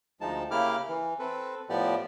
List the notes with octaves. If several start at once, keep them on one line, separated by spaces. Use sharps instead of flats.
D2 F3 G#3 D#4 A5
C#3 A#3 E4 G4 D6 F6
E3
C4 A4 B4
A2 F3 B3 G4 D5